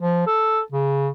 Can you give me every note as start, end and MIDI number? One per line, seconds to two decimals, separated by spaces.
0.01 0.27 53
0.27 0.60 69
0.72 1.09 49